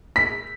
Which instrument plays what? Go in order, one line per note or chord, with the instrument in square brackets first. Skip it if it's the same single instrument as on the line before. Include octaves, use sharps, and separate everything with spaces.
[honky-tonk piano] B6